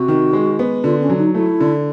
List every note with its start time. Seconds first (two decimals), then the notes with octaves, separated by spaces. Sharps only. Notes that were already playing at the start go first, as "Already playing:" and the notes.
Already playing: C3 F#4
0.08 D#3
0.33 G#3
0.59 B3
0.84 D3 F4
1.01 C#4
1.10 F#3
1.18 D#4
1.34 A3 E4
1.60 D3